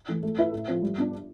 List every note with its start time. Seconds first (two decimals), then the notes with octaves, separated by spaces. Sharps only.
0.08 E3 A3
0.23 A3
0.38 E4 B4 E5
0.52 A2
0.68 F3 C4
0.83 G3
0.98 B3 D4